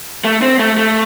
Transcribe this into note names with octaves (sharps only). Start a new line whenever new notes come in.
A3
C4
A3
A3